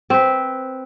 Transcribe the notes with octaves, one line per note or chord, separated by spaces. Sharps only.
C4 B4